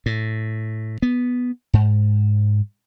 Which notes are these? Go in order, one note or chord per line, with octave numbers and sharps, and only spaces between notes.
A2
B3
G#2